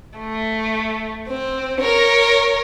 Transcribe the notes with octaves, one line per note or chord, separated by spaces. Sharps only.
A3
C4
A#4 C#5